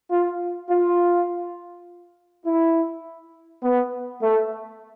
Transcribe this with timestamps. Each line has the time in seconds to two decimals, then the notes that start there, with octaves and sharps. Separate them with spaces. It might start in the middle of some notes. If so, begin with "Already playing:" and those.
0.11 F4
0.70 F4
2.46 E4
3.63 B3
4.22 A3